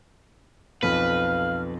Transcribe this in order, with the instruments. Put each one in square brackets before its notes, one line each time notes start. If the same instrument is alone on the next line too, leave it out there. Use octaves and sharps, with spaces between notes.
[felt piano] B1 F2 F3 [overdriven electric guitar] B4 [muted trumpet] F5 [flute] F6